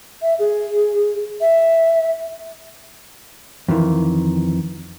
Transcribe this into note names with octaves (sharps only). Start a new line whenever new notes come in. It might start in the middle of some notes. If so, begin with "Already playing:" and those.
E5
G#4
E5
F2 D#3 E3